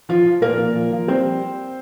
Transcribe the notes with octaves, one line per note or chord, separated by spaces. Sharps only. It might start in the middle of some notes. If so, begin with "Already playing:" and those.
F3 F4
F3
A#2 A#3 A#4
A#2
F3
F3
G3 C4 C5